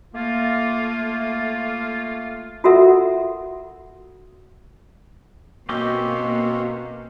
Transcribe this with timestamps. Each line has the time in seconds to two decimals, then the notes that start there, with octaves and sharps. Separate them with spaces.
0.14 A3 A#3 F4
2.64 F4 F#4 A4 A#4 E5 F#5
5.69 B2 A#3 C4 C#4 F#4 G4 D#5